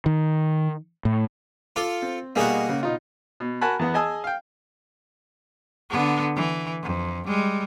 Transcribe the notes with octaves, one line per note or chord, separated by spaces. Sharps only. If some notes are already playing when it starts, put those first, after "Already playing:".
D#3
A2
F4 A4 D6
C4
B2 G3 A#3 D#4 F#4 G#4
C#3
B2 D#4 F4
B2
F#4 A#4 F#5 G#5 A5 B5
E2 B3 F#5
G#4 D#5 G#5 A5 E6
F5 G5
D3 B3
E3
F2
G3 G#3